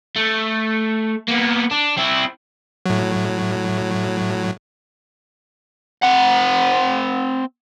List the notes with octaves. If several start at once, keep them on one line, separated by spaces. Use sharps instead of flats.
A3
A#3 B3
D4
C4 E4
A2 F#3
C4 F#5